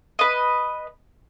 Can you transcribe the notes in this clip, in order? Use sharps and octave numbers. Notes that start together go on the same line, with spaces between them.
B4 D#5